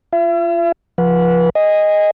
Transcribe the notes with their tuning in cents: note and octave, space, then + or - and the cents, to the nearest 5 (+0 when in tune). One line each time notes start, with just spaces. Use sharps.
F4 -25 E5 +40
F3 +0 B4 -25 F#5 -20
D#5 +0 G#5 -30